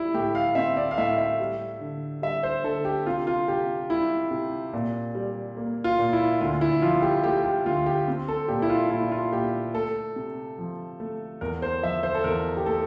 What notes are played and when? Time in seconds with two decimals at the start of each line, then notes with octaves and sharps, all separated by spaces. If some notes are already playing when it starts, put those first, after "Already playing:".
Already playing: G3 E4
0.14 A2 G4
0.35 F5
0.55 C4 E5
0.77 D5
0.91 F5
0.98 A2 E5
1.18 E5
1.40 G3
1.80 D3
2.22 G3 E5
2.43 C5
2.64 D3 A4
2.85 G4
3.06 C3 F4
3.27 F4
3.48 C3 G4
3.90 G3 E4
4.31 C3
4.73 A#2
5.15 G3
5.57 A#3
5.84 F4
5.99 A#2
6.13 E4
6.41 D2 F4
6.61 E4
6.82 F3 F4
7.02 G4
7.24 A3 G4
7.45 G4
7.66 D2 F4
7.86 G4
8.08 C4
8.28 A4
8.48 A#2 G4
8.62 E4
8.69 F4
8.90 A#2 E4
9.12 F4
9.33 A#2 G4
9.74 A3 A4
10.16 C3
10.58 F3
11.00 A3
11.41 E2 A#4
11.62 C5
11.83 F3 E5
12.03 C5
12.15 A4
12.24 E2 A#4
12.57 G4
12.66 A3 A4